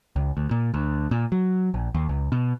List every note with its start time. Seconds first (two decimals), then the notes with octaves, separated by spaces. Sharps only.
0.16 C#2
0.37 D2
0.51 A#2
0.74 D2
1.11 A#2
1.32 F#3
1.74 A#1
1.95 D#2
2.09 C#2
2.32 B2